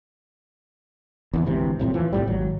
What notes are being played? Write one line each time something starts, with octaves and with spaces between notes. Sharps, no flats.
E2 D3 E3
G#1 D2 C3 E3
D#1 F2 A2 C3
E3 F3
C2 F2 A2 G3
G#1 F#3